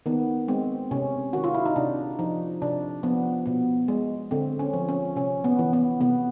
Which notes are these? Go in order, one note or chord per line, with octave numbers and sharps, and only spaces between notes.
D#3 B3
G#3 C4
C3 C#4
D#3 F#4
F4
E4
D#4
C3 D4
F3 D#4
C3 D4
F3 B3
B2 B3
G#3
D3 C4
C#4
F3
C#4
C3 C#4
B3
E3
B3
C3 B3